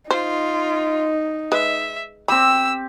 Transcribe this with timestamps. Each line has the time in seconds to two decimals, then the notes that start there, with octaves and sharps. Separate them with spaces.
0.11 D#4 F4 C5
1.52 G#3 B4 E5
2.28 C4 G4 B5 E6